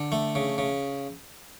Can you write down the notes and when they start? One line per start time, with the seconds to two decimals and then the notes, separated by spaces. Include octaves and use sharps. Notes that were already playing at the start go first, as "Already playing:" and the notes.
Already playing: D3
0.12 A3
0.35 C#3
0.58 C#3